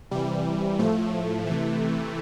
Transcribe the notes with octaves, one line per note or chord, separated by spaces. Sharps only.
C3 E3 G3
A2 F3 A3
C3 E3